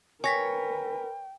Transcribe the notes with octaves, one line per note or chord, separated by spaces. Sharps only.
A#4 B4 C#5 G5 G#5 A#6 B6